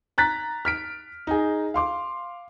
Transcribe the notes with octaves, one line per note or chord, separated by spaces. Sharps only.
A#5 F#6 A6 B6
F6 B6 D7
D#4 G#4
F5 C6 D6